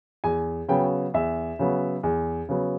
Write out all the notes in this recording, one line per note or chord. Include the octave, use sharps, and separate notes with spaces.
E2 G#5
C#3 F#3 B3 G5
E2 E5
C#3 F#3 B3
E2
C#3 F#3 B3